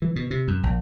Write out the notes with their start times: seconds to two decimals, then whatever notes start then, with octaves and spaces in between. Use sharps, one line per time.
0.02 E3
0.16 B2
0.31 C3
0.48 F#2
0.63 A#1